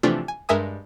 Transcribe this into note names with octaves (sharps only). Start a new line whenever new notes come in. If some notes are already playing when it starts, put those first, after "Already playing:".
C3 E3 F3 A3 D4 F4
G#5
G2 G#3 A#4 E5 G#5 D#6